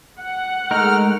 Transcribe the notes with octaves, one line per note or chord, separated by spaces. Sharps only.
F#5
G#3 A3 D#4 A#4 F6